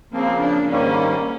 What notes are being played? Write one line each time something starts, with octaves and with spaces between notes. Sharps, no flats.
C#3 F3 A#3 C4
D4
G#2 D#3 G3 A#3 C#4